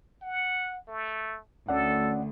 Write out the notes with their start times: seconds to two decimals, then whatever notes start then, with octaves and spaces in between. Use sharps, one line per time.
0.22 F#5
0.88 A3
1.69 D2 C#4 A4 D5 F#5